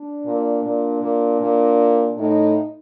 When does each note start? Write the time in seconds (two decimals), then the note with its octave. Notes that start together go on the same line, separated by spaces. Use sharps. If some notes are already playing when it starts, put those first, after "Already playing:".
Already playing: D4
0.26 A#2
0.64 A#2
1.02 A#2
1.41 A#2
2.17 A2 D#4